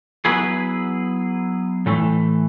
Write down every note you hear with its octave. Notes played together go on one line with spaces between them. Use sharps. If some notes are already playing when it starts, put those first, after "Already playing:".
F#3 B3 E4 G#4 B4
A2 E3 A3